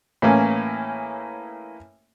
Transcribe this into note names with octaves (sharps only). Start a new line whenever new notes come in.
A2 E3 A#3 C#4